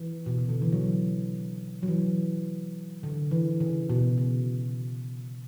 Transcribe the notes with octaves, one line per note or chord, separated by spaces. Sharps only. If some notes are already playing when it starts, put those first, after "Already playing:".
Already playing: E3
B2
C#3
D3
E3
F#3
F#3
E3
D3
E3
C#3
B2
C#3